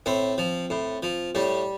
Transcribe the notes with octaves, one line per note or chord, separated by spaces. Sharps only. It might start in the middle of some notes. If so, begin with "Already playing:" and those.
A2 C4
F3
A2
F3
A2 G3